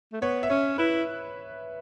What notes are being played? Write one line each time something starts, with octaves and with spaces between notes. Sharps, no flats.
A3
B3 C#5
E5
C#4 C#5
E4 B4